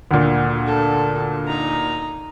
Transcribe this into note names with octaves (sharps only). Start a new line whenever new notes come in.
D2 A#2
A4
D#4 A#5